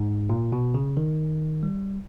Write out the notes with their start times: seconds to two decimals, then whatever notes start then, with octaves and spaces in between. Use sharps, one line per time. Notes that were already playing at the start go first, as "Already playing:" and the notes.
Already playing: G#2
0.29 A#2
0.52 B2
0.74 C#3
0.97 D#3
1.63 G3